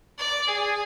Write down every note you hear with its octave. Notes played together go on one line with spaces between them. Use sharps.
D5
G#4